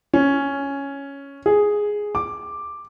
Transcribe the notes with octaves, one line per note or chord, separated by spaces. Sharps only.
C#4
G#4
D6